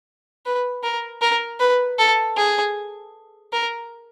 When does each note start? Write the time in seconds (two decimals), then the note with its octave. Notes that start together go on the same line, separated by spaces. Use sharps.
0.46 B4
0.84 A#4
1.22 A#4
1.60 B4
1.98 A4
2.37 G#4
3.53 A#4